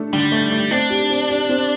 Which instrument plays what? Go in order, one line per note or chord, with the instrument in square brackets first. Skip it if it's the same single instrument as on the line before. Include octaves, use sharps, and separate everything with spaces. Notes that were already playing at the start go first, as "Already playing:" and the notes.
Already playing: [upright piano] A3 D4 A4
[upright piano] D3 [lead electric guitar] G3
[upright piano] A3
A3
[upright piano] C4 [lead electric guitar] D4
[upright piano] G4
C4
G4
C4